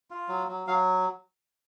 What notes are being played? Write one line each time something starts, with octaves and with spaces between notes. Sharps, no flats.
F4
F#3
F#3
F#3 F5